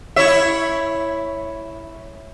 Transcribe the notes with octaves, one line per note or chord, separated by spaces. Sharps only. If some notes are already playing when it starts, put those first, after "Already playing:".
E4 C#5 E5